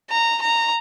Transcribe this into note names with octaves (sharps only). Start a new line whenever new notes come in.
A#5
A#5